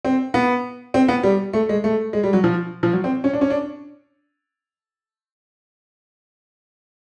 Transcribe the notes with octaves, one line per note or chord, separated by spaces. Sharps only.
C4
B3
C4
B3
G3
A3
G#3
A3
G#3
G3
F#3
F3
F3
F#3
C4
C#4
D4
C#4
D4